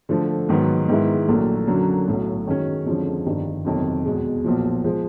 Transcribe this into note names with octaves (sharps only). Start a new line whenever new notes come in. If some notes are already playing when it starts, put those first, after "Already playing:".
D3 F3 A3
G#2 D#3 F#3 B3
G#2 D#3 G#3 B3 E4
A#1 A#2 F#3 A3
F#2 D3 F#3 A#3
B1 A2 F#3
F#2 D#3 G#3 C#4
F2 D3 F3 G#3 C#4
G1 G2 D#3 G3
G1 F2 C3 D#3 F#3
E2 B2 G#3
B1 A#2 F3
F3 G#3